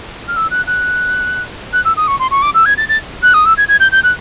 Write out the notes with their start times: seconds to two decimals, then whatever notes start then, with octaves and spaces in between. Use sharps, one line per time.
0.28 F6
0.36 E6
0.51 F#6
0.67 F#6
1.73 F#6
1.85 E6
1.97 D#6
2.08 C#6
2.19 C6
2.31 C#6
2.42 D6
2.54 E6
2.66 G#6
2.77 A6
2.89 A6
3.23 F#6
3.34 D#6
3.45 E6
3.57 G#6
3.68 G#6
3.80 G6
3.92 G6
4.03 F#6